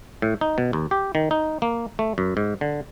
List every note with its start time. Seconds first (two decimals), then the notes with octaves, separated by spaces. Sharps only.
0.22 A2
0.41 D#4
0.58 B2
0.73 D#2
0.91 G4
1.15 D#3
1.31 D#4
1.62 A#3
1.99 A3
2.18 F#2
2.37 G#2
2.61 D3